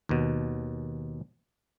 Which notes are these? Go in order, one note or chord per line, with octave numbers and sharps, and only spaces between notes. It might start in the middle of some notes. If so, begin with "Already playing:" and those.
D#2 B2